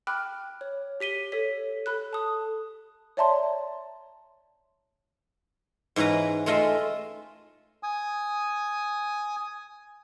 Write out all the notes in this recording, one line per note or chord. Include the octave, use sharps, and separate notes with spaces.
G5 B5 D6 F6 F#6
C#5
G4 B6 D#7 G7
A4 C#5 B6
A4 B5 F#6
A5 D#6
C#5 D5 E5 A5 A#5 C6
G#2 E3 C#4 B4 A#5
G#3 A3 F4 D#5 E5
G#5 D#6